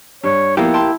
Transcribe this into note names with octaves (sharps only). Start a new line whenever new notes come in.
G2 C#5
F3 A#3 B3 E4 G4
G5 A5 C6